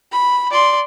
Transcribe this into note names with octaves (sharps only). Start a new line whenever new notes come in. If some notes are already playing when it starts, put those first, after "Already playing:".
B5
D5 C6